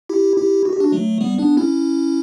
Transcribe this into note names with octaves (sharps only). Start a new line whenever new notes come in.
E4 G4
E4 G4
F#4
G4
D4 F#4
F#3 A3
G3 B3
B3 D4
C#4 E4